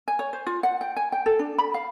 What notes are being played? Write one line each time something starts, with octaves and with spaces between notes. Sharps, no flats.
G#5
C#5
C5
F4
F#5
G5
G#5
G5
A4
D4
B5
F5